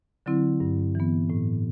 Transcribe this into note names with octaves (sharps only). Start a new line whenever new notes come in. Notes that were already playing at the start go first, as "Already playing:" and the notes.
D3 F#3 C4 E4
G2
E3 B3
A2